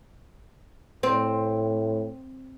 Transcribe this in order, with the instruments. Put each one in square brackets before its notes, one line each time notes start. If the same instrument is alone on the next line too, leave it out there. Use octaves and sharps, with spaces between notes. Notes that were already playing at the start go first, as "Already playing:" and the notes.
[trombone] A2 [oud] C4